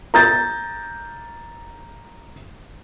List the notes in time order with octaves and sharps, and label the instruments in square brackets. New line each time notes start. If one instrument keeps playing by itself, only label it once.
[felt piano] A#5 G6 A6